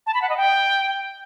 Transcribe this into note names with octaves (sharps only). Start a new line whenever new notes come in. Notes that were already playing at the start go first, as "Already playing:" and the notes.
A5
B5
F#5
D#5
G5